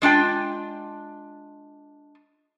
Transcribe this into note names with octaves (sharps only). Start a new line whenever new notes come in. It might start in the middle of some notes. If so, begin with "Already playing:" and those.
G#3 D4 F4 G5